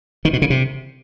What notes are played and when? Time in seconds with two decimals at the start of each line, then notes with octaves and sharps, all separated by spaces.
0.25 D#3
0.33 B2
0.42 C#3
0.50 C3